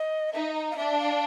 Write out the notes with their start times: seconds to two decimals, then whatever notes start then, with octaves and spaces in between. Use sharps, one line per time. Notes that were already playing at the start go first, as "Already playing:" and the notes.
Already playing: D#5
0.33 D#4 E5
0.54 D#5
0.71 F5
0.76 D4 E5
0.99 F5